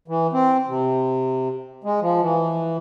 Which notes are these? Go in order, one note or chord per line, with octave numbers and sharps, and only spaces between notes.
E3
C4
C3
G#3
F3
E3